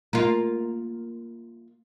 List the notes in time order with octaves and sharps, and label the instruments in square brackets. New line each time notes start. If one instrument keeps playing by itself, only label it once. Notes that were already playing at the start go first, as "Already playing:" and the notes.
[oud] A#3 F4